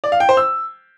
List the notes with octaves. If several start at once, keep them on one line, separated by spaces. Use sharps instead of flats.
D5
F5
G5
C5
E6